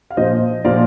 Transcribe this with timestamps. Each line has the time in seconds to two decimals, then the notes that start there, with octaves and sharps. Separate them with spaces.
0.10 F5
0.17 A#2 F3 C5 D#5
0.64 A#2 F3 D5 F5